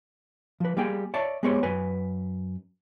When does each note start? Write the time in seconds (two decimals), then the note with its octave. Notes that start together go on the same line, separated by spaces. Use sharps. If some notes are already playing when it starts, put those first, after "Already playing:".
0.60 F3 B4
0.77 G3 A#3 G#4 G5 G#5
1.14 C#5 D5 E5 A5
1.43 G#3 B3 G4 G#4 C5 C#5
1.63 F#2 B4 G#5